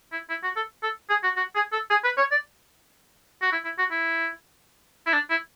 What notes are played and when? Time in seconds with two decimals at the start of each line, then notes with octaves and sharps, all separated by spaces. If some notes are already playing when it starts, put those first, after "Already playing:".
0.12 E4
0.30 E4
0.44 F#4
0.56 A4
0.83 A4
1.10 G#4
1.24 F#4
1.37 F#4
1.55 G#4
1.72 A4
1.90 G#4
2.04 B4
2.17 C#5
2.31 D5
3.42 F#4
3.52 E4
3.65 E4
3.79 F#4
3.91 E4
5.06 E4
5.13 D4
5.30 E4